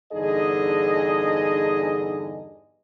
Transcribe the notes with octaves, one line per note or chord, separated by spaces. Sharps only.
E2 G2 D3 D#4 G#4 D#5